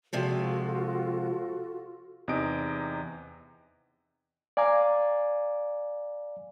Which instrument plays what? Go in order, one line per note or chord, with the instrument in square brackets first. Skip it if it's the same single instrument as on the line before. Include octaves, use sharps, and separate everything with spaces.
[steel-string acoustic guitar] C3 F3 G#3 [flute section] F4 F#4 A4
[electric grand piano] E2 C3 D#4 D#5 D#6 D7
[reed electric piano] D5 F5 G#5 A#5 D6